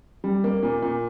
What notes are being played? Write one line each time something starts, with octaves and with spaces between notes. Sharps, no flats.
G3
A#3
A#2
A#2